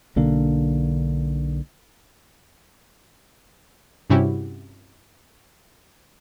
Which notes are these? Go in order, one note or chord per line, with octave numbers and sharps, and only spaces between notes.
B1 D3 A#3 D4
G2 C3 C#4 E4 F#4 G4